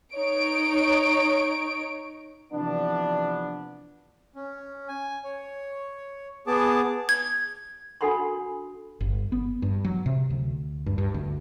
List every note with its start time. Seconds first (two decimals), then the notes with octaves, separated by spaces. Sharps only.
0.13 D#4 C#5 D7
2.52 C3 E3 F3 B3 D4
4.36 C#4
4.88 G#5
5.24 C#5
6.47 B3 G#4 A5 D6
7.09 G#6
8.01 D4 F#4 A4 F#5 B5 C6
9.01 G1
9.32 B3
9.62 G2
9.85 F#3
10.06 C3
10.30 D2
10.86 G2
10.98 G2
11.14 D2